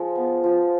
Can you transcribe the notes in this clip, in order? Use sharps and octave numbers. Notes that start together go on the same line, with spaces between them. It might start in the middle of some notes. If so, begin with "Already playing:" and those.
Already playing: F3 G#3
B3
F3